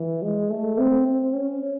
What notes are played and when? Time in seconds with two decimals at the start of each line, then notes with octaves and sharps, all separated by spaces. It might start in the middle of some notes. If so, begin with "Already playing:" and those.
Already playing: E3
0.22 G#3
0.50 A3
0.78 C4
1.06 C4
1.34 C#4